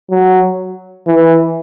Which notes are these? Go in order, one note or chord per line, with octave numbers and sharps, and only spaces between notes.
F#3
E3